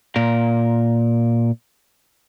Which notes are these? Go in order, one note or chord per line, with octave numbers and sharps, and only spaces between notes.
A#2 A#4